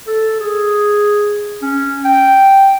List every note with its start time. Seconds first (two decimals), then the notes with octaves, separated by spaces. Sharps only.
0.07 A4
0.40 G#4
1.62 C#4
2.05 G5